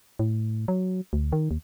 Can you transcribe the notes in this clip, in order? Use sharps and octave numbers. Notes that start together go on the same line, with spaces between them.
A2
F#3
D2
D#3
D#2